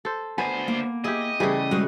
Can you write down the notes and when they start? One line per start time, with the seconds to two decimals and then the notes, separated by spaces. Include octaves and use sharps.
0.05 A4 C5
0.38 D2 B3 C5 G#5
0.68 A#3
1.04 E4 G4 G#4 D#5
1.40 C#3 E3 G3 A3 G4 G#4
1.71 B2 G3 G#3 F#5